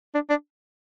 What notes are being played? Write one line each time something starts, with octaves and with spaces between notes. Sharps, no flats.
D4
D4